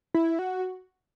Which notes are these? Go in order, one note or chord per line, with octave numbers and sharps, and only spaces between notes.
E4
F#4